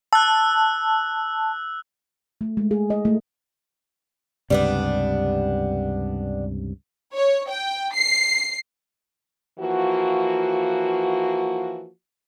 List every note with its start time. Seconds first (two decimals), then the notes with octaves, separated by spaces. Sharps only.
0.13 A5 E6 F#6
2.41 A3
2.57 G#3
2.71 G#4
2.90 D#5
3.05 A3
4.50 C#2 G2 C3 G3 B3 D4
7.14 C#5
7.48 G5
7.93 C7
9.59 E3 F3 A#3 F#4